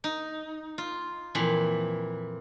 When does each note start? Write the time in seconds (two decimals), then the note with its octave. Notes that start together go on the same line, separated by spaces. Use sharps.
0.04 D#4
0.78 F4
1.35 F2 A#2 E3